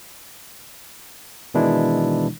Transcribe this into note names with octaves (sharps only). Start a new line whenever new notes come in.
B2 D#3 E3 G#3 D4 E4